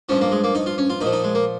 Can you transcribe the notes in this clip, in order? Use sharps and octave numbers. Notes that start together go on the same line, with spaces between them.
G2 F3 C#4
A#3
G#3
A#3
D#4
F4
C#4
F4
A#2 F3 D#4
D#4
G#3
A#3